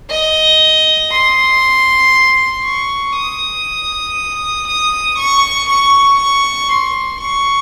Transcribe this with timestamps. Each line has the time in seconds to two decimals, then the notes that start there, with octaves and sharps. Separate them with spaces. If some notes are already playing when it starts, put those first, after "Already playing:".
0.10 D#5
1.12 C6
2.64 C#6
3.16 D#6
4.68 D#6
5.18 C#6
5.69 C#6
6.20 C#6
6.72 C6
7.21 C#6